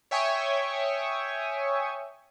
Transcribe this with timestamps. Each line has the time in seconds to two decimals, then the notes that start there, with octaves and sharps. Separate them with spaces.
0.11 C#5 E5 G5 G#5 C#6 D#6